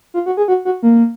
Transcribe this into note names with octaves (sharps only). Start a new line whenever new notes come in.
F4
F#4
G#4
F#4
F#4
A#3